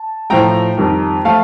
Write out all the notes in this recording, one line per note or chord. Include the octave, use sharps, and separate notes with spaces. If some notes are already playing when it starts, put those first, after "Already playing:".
Already playing: A5
A2 F3 A3 G5 A#5
F2 D#3 G3
F3 A3 F5 A5